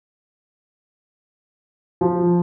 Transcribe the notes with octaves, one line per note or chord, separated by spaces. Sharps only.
F3